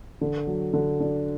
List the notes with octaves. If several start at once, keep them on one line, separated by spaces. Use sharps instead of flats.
D3
F#3
D3
D4